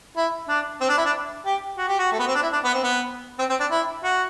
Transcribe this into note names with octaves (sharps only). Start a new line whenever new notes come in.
E4
D4
C4
D4
E4
D4
G4
F#4
G4
F#4
A3
B3
C4
D4
E4
D4
B3
C4
B3
C4
C4
D4
E4
F#4